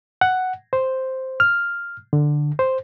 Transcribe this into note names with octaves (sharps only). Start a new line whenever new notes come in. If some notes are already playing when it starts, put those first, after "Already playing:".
F#5
C5
F6
D3
C5